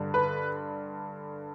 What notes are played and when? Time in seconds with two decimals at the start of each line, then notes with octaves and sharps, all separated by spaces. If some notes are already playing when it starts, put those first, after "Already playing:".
Already playing: G2 D3
0.14 B4